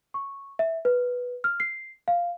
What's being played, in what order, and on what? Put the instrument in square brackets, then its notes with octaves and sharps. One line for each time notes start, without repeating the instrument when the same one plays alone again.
[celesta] C#6
E5
B4
F6
C7
F5